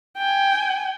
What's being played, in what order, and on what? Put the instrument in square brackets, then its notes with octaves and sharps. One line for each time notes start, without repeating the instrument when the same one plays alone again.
[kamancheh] G5 G#5